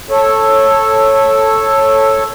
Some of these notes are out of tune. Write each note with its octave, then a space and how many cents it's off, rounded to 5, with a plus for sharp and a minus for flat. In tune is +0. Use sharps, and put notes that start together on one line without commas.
A4 +0 C#5 -15